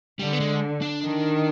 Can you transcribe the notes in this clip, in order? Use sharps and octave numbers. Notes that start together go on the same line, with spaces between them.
D3 G3
B3
G#3
D4
D#3